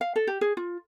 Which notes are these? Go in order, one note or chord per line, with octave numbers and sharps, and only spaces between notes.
F5
A4
G4
G#4
F4